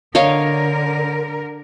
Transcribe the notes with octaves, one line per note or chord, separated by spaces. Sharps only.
D3 A#4 C#5 D#5 F5